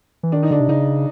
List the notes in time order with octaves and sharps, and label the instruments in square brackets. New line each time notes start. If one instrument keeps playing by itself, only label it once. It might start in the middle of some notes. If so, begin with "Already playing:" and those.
[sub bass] E3
[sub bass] D#3 [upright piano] D4
[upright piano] D#4
[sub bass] D3 [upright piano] D4
[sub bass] C3
[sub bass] C#3 [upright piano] D#4